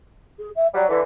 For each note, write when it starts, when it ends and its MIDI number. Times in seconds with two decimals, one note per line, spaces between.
0.39 0.50 68
0.56 0.67 76
0.74 0.84 54
0.74 0.84 55
0.74 0.87 74
0.90 1.01 50
0.90 1.01 52
0.90 1.01 71